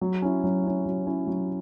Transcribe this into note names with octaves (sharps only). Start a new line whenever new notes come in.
F#3
C#4 E4
F#3
C#4 E4
F#3
C#4 E4
F#3